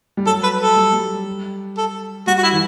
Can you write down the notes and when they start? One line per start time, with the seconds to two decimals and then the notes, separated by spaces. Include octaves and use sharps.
0.17 G3
0.26 F#3 A4
0.43 B4
0.60 A4
0.76 G3
0.93 G3
1.77 A4
2.27 G3 F#4
2.38 F#4
2.43 E4
2.52 E3